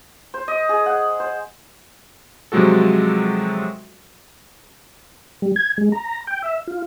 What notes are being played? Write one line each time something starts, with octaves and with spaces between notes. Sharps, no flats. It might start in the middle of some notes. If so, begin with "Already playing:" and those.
C5
D#5
G#4
F#5
C5
C3 F3 F#3 G#3 F#4 A4
G3
G#6
G#3
A#5
G5
E5
F4